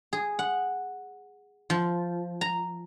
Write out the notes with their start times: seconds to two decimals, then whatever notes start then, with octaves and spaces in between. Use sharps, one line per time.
0.13 G#4
0.39 F#5
1.70 F3
2.41 A#5